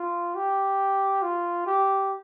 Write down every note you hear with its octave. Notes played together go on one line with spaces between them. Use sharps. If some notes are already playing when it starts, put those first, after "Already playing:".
Already playing: F4
G4
F4
G4